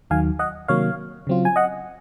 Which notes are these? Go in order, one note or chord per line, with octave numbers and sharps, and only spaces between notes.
D#2 D#3 F#3 F5 G#5
D#5 F#5
C3 D#3 F#3 A#3 C#5 F5
C#3 F#3 C4 F4
G#5
D#5 F#5